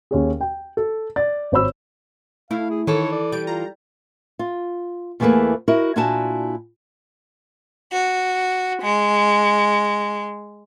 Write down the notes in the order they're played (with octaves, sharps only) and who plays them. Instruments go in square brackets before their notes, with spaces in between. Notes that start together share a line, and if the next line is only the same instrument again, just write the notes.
[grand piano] D#2 C#4 G#4
G5
A4
D5 A6
G#1 C5 C#5 B5 E6
[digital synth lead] A3 [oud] E4 [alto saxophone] F5
[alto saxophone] G#4
[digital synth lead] D#3 [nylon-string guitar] E3 A4 [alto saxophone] C#5
[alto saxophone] D5
[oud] G3 [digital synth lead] D7
[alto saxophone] F4 [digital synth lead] A#5
[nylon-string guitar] F4
E2 E3 A3 A#3 G#4 B4
E4 F#4 A#4 D#5
A#2 D4 E4 F#4 G#5 A5
[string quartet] F#4
G#3